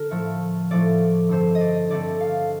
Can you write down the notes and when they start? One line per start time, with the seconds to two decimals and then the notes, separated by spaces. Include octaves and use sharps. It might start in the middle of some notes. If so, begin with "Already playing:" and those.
Already playing: D3 A#4
0.10 A2 F3 A3
0.71 A2 F3 A3 D5
1.29 G2 D3 A3 C4 C5
1.55 D#5
1.61 D5
1.90 G2 D3 A3 C4 D5
2.21 F5